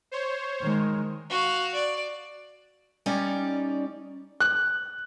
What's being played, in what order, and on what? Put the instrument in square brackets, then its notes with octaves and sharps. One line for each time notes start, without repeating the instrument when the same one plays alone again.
[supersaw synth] C5 C#5
[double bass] D#3 G#3
[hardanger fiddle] F#4 F5
D5
[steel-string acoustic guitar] G3 C#4 D#4 D5
[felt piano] F#6